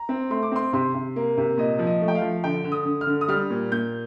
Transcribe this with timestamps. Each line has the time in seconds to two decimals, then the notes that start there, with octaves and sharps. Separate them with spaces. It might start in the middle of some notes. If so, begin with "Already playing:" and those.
Already playing: A#5
0.09 C4
0.30 A3 C6
0.42 D6
0.52 C4 C6
0.73 C3 C6
0.94 C3
1.16 A#3
1.37 C3
1.58 A#2 D#5
1.79 F3
1.87 D#5
2.02 A3
2.08 G5
2.15 F5
2.22 F3
2.44 D3 G5
2.64 D3
2.72 D#6
2.86 D3
3.01 F6
3.07 D3
3.21 D#6
3.28 G3 F6
3.50 A#2
3.72 A#2 G6